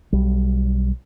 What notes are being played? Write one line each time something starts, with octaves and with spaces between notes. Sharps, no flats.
B1 G3